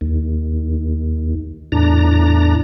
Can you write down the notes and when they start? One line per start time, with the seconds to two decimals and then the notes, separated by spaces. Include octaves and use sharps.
0.01 D#2
1.72 E2 A2 D4 A#5